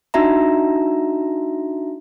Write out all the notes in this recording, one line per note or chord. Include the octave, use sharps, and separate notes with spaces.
D4 D#4 F#4 E5 A#5